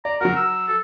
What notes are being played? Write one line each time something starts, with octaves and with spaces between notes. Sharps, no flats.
D5 A#5
F#3 F#4 A#4
E6
A4